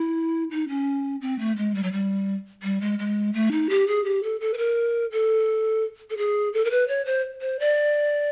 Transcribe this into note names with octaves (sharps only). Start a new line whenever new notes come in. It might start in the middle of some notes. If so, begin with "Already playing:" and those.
Already playing: E4
D#4
C#4
C4
A3
G#3
G3
F#3
G3
G3
G#3
G#3
A3
D#4
G4
G#4
G4
A4
A4
B4
A#4
A4
A4
G#4
A4
A#4
B4
C#5
C5
C5
D5